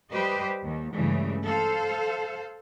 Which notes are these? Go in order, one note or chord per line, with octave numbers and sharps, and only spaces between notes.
G3 G4 B4 C5 D#5
D#2
G2 C#3 E3 G#3 A3
A4 C5 F5